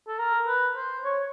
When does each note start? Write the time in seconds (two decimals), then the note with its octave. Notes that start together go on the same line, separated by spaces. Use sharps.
0.08 A4
0.19 A#4
0.47 B4
0.76 C5
1.05 C#5